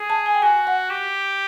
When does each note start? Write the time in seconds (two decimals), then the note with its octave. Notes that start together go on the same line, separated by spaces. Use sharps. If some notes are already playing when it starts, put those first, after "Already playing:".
Already playing: G#4
0.10 A5
0.26 G#5
0.35 G5
0.42 F#4 G#5
0.67 F#5
0.90 G4